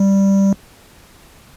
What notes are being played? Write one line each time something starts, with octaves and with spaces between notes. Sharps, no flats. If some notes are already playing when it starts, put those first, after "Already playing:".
Already playing: G3